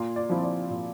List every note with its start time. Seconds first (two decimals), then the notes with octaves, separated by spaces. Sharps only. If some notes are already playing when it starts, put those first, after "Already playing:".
Already playing: A#2 C6
0.16 D5
0.30 F3 C4 E4
0.43 D5
0.70 A#2